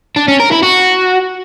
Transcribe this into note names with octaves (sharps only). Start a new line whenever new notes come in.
D4
C#4
A#4
E4
F#4